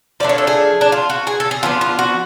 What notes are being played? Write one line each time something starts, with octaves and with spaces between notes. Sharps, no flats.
F3 A3 D4 D5
C#5
A4
G#4
D4
F4
F#4
G#4
A4
G#4
F3 B3 D4 F4
F4
F#4